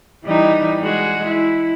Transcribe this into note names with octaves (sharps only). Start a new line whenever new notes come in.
E3 G3 D#4
G#3 F#4 G#4
E4